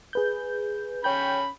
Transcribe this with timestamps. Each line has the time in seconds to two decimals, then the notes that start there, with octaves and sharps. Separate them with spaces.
0.13 G#4 B4 G6
1.04 C#4 C#5 G5 B5 G6